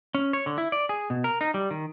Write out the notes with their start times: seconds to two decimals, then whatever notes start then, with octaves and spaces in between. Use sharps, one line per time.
0.15 C#4
0.33 C#5
0.46 D3
0.58 E4
0.72 D5
0.89 G#4
1.10 B2
1.24 A#4
1.41 D#4
1.54 G3
1.71 D#3